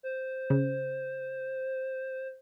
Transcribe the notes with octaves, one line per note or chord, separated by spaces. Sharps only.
C5
C#3